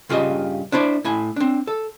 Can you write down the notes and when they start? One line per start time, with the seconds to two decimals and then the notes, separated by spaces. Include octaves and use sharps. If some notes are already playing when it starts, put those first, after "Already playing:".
0.09 G2 C#3 F4 G4 D#5
0.72 D4 E4 C5 D5
1.04 A2 E4 G#5
1.36 C4 D4
1.67 A4